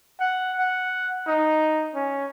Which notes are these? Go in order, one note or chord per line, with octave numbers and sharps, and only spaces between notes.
F#5
F#5
D#4
C#4